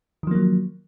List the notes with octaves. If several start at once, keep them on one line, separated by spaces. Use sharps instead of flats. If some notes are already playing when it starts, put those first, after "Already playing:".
D#3 F3 F#3 A#3